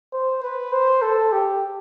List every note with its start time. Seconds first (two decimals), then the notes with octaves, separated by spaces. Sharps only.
0.13 C5
0.42 B4
0.72 C5
1.02 A4
1.32 G4